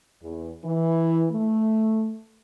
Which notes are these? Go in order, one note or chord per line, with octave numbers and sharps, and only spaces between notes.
E2
E3
A3